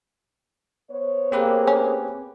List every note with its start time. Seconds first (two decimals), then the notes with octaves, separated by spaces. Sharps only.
0.91 B3 C5 C#5
1.32 A#3 C4 G4 G#4 B4
1.67 C#4